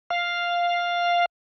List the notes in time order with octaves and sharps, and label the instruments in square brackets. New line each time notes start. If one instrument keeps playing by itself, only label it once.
[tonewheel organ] F5